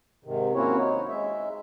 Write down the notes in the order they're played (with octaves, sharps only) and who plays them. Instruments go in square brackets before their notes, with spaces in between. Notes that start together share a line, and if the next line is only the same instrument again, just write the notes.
[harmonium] G#2 C3 D#3
A#3 C4 C#4 E4 F#4 C#5
D#4 C#5
G#3 E5